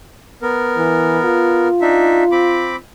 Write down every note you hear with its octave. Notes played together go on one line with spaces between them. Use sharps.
B3 A#4
E3
F4
D4 D#4 E5
C4 B5 D6